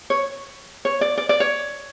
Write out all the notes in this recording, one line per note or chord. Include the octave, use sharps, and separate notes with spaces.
C#5
C#5
D5
D5
D5
C#5